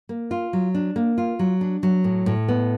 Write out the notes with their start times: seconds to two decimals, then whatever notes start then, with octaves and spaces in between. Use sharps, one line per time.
0.09 A#3
0.31 F4
0.53 F#3
0.75 D4
0.96 A#3
1.18 F4
1.39 F#3
1.61 D4
1.83 F#3
2.04 A2
2.26 A2
2.48 B3